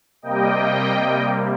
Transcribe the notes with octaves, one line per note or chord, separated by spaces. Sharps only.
C3 G3 A#3 D#5 G5